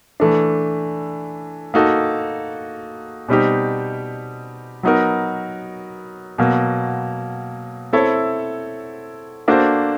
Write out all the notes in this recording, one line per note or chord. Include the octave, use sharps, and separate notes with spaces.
E3 A3 D4
A#3 D#4 F#4 A4
B2 G3 C4 D#4 G4
F#3 B3 D#4 F#4 A#4
B2 F#3 A#3
C4 E4 A4 C#5 E5
A#3 D4 F#4 A4 C5